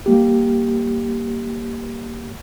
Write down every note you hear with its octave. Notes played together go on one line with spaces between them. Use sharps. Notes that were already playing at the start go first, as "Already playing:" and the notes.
G3 A#3 G4